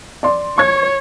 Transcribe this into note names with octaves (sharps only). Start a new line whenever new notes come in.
D5 C6
C#5 C#6 G#6